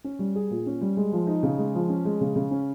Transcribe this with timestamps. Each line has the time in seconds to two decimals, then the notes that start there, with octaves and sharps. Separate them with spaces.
0.04 C#4
0.19 G3
0.35 G#4
0.50 A#2
0.66 C#4
0.81 G3
0.97 G#3
1.12 F3
1.27 D#4
1.43 C#3
1.58 G#3
1.75 F3
1.89 C#4
2.05 G#3
2.21 C#3
2.36 C#3
2.51 C#4